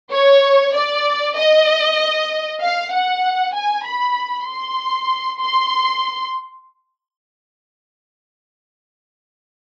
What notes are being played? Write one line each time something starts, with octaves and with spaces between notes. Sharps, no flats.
C#5
D5
D#5
F5
F#5
G#5
B5
C6
C6